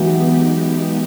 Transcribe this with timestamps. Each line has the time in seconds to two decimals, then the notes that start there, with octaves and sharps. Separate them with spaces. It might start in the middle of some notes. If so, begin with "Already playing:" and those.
Already playing: E3 F#3 G#3 B3 D#4 G4